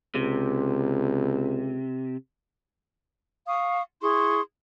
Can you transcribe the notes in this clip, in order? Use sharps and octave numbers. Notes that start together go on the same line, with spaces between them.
C#2 C3
F5 C#6 D#6
E4 G#4 C6 C#6